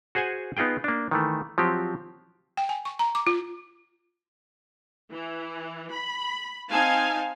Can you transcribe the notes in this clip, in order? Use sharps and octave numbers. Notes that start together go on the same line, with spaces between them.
F#4 G#4 C5 F#5 G#5
B3 D#4 F4 G#4 G5
A#3 D4
D#3 E3 A3
F3 F#3 C4 G4
G5
G#5
C#6
A#5
D6
F4
E3
B5
C4 D#4 F5 G#5 A5